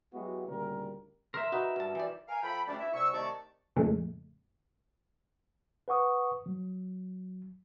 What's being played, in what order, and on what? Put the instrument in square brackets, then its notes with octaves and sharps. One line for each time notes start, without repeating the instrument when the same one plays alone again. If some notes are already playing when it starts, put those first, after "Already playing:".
[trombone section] F#3 G#3 B3 E4 F#4 G4
D2 A#2 C#3 G3 A#4
[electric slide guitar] A#4 E5 [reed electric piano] C6
[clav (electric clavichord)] D#4 B4 [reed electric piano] F#4
[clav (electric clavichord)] G2 A5
E3 G4 D5
[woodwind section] A#4 F5 G#5
F3 A4 G5 B5
D2 G3 A3 C#4 D4 D5
E4 E5
C2 C#6 E6
C3 D#3 A3 D5 A5 C#6
[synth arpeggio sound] F2 A#2 C#3 G#3 A3
[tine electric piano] B4 F#5 C#6 D#6
F#3